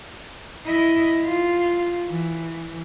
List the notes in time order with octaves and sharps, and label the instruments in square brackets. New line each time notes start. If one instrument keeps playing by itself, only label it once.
[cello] E4 D#5
F4
E3